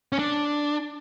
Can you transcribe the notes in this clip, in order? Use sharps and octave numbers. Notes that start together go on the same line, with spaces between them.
C#4
D4